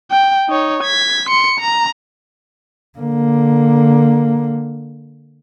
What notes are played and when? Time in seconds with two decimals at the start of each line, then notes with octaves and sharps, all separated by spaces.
0.11 G5
0.49 D#4 C#5
0.83 G#6 B6
1.29 C6 C#7
1.60 A#5
2.98 D3 A#3